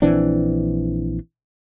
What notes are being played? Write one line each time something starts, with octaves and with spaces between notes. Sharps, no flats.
A#1 E3 C4 D4